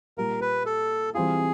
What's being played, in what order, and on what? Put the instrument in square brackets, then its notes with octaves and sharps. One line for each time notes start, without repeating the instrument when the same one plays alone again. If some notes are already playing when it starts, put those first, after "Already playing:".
[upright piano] A#2 G3 A#3 [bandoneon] A#4
[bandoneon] B4
A4
[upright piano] E3 G3 C4 F4 [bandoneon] G#4